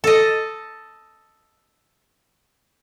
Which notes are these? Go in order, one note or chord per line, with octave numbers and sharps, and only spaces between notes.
A4 D#5